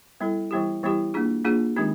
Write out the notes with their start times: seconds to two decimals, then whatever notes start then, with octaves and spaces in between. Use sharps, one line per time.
0.21 G3 B3 E4 A4
0.51 E3 G3 B3 E4 G4
0.83 E3 G3 B3 E4 G4
1.14 A#3 D4 F4 G#4
1.45 A#3 D4 F4 G#4
1.76 D#3 G#3 C4 D#4 G4